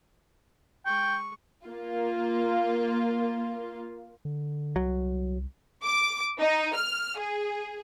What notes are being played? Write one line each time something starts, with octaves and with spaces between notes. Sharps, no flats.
G#3 G5 C#6
A#3 F4
D3
C2 F#3
D6
D#4
F6
G#4